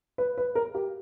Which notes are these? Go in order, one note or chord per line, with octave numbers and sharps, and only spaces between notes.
B4
B4
A#4
G4